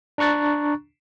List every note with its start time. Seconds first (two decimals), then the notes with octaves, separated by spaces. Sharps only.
0.18 D4 A#5 C#6 F#6 A6